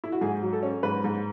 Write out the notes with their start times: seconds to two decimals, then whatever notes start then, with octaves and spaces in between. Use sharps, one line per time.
0.04 E4
0.12 F#4
0.21 G#2 G#4
0.42 F#3
0.53 A4
0.63 C#4
0.83 G#2 B4
1.04 G#2